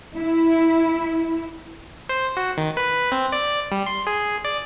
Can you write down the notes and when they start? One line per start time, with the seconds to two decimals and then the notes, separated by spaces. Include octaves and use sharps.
0.15 E4
2.09 C5
2.37 F#4
2.58 D#3
2.77 B4
3.12 C4
3.32 D5
3.72 G3
3.86 C6
4.07 G#4
4.45 D5